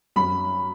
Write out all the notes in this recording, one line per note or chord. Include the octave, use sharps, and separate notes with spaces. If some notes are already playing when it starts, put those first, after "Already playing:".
F#2 B5